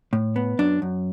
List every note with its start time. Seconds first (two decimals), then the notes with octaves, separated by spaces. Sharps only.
0.13 A2
0.36 B3
0.59 F#2 D4
0.82 F#2